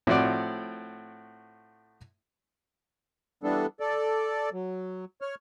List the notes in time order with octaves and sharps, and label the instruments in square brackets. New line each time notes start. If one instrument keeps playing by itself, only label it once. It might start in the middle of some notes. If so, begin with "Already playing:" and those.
[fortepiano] A2 F3 C4 F#4 D5
[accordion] E3 G3 B3 D4 A4
A4 D5
F#3
C#5 F6